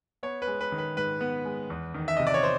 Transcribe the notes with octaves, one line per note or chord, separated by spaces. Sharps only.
B3 C#5
B4
G#3
B4
D#3
B4
G#2 B4
B3
G#3
E2
D#3
E5
C3 D#5
D5
C#5
C5